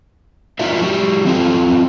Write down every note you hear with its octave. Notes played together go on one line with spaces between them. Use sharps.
D#4 F4 F#4 A#4 D5 E5
F#3 G4
F#3 C4 F4 A4